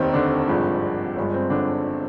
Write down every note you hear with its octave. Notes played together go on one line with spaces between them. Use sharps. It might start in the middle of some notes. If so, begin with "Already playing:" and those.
Already playing: F1 D#2 D#3 C4
D3 D4
G#1 G2 F3 G#3
G1 G2 F3 G#3
C4
D3 D4